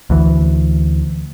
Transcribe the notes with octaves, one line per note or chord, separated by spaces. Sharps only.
D2 E3